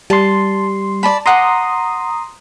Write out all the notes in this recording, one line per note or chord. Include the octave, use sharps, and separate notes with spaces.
G3 A5 C6
D5 A5 B5
F#5 A#5 C6 D6 D#6